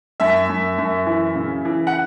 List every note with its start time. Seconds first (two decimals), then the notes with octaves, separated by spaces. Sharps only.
0.20 F#2 E5
0.49 F#2
0.78 F#2
1.06 E3
1.35 C#3
1.65 E3
1.87 F#5